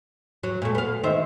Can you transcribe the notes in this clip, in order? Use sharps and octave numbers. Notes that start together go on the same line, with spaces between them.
F#3
A#2 A3
B3 F5
D#3 C5 E5